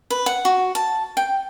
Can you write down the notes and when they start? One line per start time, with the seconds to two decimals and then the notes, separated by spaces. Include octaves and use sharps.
0.10 B4
0.26 F#5
0.45 F#4
0.75 A5
1.17 G5